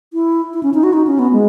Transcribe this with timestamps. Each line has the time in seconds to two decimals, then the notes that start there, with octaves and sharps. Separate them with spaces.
0.14 E4
0.53 E4
0.63 C#4
0.74 D#4
0.84 F#4
0.93 D#4
1.07 C#4
1.19 B3
1.32 G#3